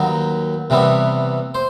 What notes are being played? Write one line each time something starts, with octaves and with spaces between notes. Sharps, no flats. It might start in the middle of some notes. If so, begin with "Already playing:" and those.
Already playing: D#2 D#3 F#3 B4
C3 E3 G3 B3
C5